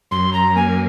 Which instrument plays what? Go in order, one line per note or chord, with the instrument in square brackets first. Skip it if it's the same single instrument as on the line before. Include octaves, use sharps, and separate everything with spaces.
[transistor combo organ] F#2 [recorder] C6
[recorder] A#5
[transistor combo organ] A#3 [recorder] G#5